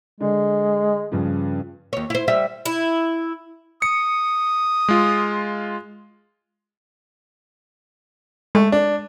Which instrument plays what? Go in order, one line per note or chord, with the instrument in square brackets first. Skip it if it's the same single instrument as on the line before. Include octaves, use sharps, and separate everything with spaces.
[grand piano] D3 [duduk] G#3
[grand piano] G2 C#3 F3
[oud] D#2 C#5
E4 C5
G3 E5
[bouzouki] E4
[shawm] D#6 [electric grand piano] C#7
[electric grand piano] G#3 F4
[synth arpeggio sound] G#3 [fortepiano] A3
[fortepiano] D4